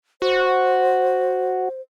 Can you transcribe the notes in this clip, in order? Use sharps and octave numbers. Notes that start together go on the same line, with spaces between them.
F#4 C5